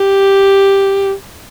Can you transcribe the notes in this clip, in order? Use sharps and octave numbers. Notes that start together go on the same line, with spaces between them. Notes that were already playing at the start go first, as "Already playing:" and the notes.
Already playing: G4